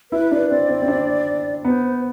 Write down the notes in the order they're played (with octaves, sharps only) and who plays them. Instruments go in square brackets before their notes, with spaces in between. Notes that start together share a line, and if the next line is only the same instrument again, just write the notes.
[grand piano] E4 [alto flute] B4
[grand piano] D4
[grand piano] C4 [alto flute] D5
[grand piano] C4
C4
D4
[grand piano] B3 [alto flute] C5